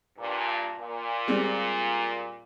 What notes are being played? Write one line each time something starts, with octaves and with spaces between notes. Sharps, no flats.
G2 A#2
A#2
G3 G#3 C4